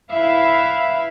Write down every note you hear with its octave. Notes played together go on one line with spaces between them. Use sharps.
E4 B4 E5 F5 B5